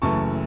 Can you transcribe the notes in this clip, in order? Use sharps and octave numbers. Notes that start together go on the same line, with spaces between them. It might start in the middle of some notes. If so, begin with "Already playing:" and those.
F#1 F#2 E3 A3 A5 C#6